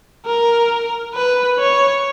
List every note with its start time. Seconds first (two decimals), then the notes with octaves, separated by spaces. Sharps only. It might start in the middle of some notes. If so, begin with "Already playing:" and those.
0.26 A#4
1.14 B4
1.59 C#5